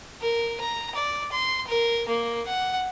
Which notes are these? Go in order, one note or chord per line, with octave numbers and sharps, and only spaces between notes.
A#4
A#5
D5
C6
A#4
A#3
F#5